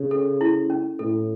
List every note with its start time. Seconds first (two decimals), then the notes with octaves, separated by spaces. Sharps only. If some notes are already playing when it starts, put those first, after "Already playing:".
Already playing: C#3
0.11 A4
0.41 E4
0.70 C#4
0.99 A2 A4